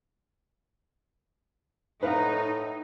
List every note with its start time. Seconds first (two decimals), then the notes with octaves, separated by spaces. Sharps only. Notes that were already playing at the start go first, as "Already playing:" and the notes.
2.03 A2 D#4 B4 F5 F#5